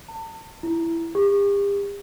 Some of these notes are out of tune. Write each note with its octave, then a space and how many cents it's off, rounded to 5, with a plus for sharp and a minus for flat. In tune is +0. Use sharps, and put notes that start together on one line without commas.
A5 +35
E4 +10
G4 +40